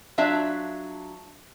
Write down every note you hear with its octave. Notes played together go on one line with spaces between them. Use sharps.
F#3 D4 F4 E5 F5